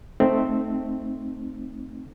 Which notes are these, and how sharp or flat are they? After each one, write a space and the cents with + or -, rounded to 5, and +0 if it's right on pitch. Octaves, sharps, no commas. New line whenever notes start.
A3 +0 C4 +0 D#4 -10